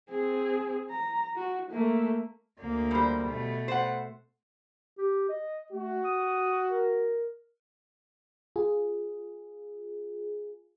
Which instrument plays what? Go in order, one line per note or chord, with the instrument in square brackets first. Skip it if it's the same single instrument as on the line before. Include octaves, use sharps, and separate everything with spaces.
[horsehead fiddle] C4 G#4
A#5
F#4
A3 A#3
[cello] D2 A#3
[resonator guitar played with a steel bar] G3 C5
[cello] B2 A3
[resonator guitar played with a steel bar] C5 F#5
[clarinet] G4
D#5
[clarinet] A3 [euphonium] F#4
[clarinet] D#6
A#4
[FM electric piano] F4 G#4